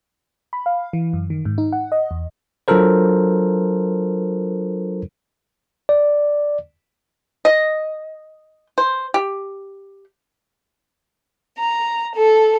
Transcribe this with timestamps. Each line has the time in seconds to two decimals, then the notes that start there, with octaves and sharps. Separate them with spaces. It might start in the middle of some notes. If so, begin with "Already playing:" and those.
0.53 B5
0.66 F5
0.93 E3
1.13 F#2
1.30 D#3
1.45 G#2
1.58 D#4
1.72 F#5
1.92 D#5
2.11 E2
2.68 F#3 D4 F4 A4 A#4 C5
5.89 D5
7.45 D#5
8.78 C5
9.14 G4
11.57 A#5
12.15 A4